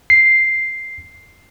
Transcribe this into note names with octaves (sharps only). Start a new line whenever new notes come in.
C7